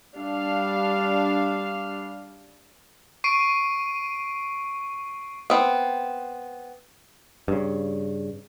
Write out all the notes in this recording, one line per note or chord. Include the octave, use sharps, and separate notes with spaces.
G3 D4 F5
C#6 C7 D7 D#7
B3 C4
G2 C#3